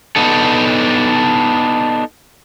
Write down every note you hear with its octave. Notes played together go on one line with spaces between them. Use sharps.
B3 D4 D#4 A4